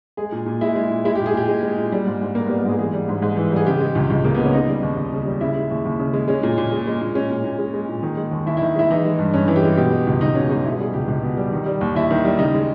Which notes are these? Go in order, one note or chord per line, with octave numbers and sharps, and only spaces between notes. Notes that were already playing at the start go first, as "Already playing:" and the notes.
G#3 G#4
A#2
A#2
G#3 E4
G#3
A#2
G#3 E4
G4
A#2
G#4
A#2 G4
G#3
G#3
A#2
G3
G#2
G#2
G3 A#3
B3
G3
A#4
G#2 G#4
E3 G#4
G3
G#2
G#2
E3
G3 G#4
C#3 G4
G#3
C#2
C#2
C#3 A#3
B3
G#3
C#4
C#3 D#4
G3
D#2
D#2
C#3
G3
C#3 E4
G#3
D#2
D#2
C#3
G#3
G#3 C#4
A#2
A#2
G#3
G#3
A#2
G#3 C#4
A#2
A#2
G#3
G#3
A#2
D#3
G#3
D#2
D#2 E4
E4
D#3
G#3 E4
E3 D#4
G#3
G2
G2 C#4
E3
G4
G#3
B2 G4
G#3
C#2
C#2 D#4
B2 C#4
G#3 D#4
B2 E4
G3 G#4
C#2 G4
C#2
B2
G3
D#3
G3
D#2
D#2 E4
D#3
G3
C#3 D#4
G#3